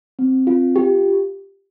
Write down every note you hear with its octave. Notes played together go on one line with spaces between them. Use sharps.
C4
F4
G4